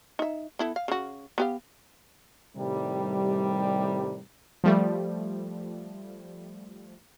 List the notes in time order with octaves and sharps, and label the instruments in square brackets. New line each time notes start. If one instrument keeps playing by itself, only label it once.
[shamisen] D#4 E5
B3 E4 A4
F5
C#3 F#4
B3 G4 F5
[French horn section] A2 C3 D#3 G3
[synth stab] F3 G3 A3